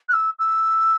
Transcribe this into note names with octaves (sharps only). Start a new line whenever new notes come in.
F#6
E6
E6